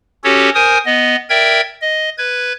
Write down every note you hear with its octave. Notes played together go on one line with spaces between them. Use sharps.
C#4 F#4 G4 A4 C#5
A#4 C5 G#5 D#6
B3 D#5
A#4 D5 E5 G5 G#6
D#5
B4 G#6